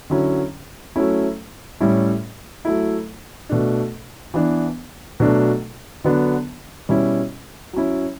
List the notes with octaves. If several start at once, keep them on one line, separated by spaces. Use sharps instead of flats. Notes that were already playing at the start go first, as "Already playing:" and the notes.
D3 F#3 C#4 E4
F#3 A3 C#4 E4
A2 G3 C#4 E4
F#3 A3 E4
B2 A3 D4
E3 B3 D4
B2 F#3 A3 D4
D3 F#3 B3 D4
B2 G3 C#4 E4
F#3 C#4 E4